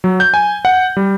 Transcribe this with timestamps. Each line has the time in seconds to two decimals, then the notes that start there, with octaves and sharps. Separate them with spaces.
0.04 F#3
0.20 G6
0.34 G#5
0.65 F#5
0.97 G3